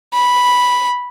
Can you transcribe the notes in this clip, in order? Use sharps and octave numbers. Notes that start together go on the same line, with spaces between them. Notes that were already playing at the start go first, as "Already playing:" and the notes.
B5